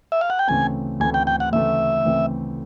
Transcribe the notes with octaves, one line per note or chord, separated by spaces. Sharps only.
E5
F5
F#5
G5
D2 C#3 E3 A3 C4 G#5
D2 C#3 E3 A3 C4 G#5
G5
G5
F#5
D2 C#3 E3 A3 C4 E5
D2 C#3 E3 A3 C4